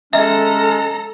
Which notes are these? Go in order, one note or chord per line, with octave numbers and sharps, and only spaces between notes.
G#3 C#4 A4 D#5 E5 A#5